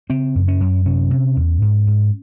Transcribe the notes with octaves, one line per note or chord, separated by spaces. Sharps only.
C#3 C4
F#2
C#4
F#2
C3 C#4
C3
E2
G#2
G#2